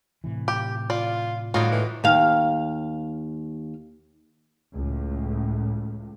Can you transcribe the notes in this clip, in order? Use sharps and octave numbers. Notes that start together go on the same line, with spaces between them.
A2 C3 E3
G4
F4 D5
A2 D3 D#4 F4 F#4
E3
D#2 F5
C#2 A2